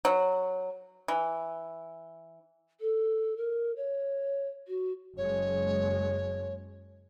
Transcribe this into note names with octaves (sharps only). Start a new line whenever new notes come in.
F#3
E3
A4
A#4
C#5
F#4
F#1 G#3 C#5